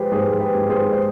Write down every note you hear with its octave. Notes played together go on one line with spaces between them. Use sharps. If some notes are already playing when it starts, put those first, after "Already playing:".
Already playing: F3 G#3 G4 G#4 B4 C5
G#2 G#4 C5
G4 B4
G#2
G#4 C5
C5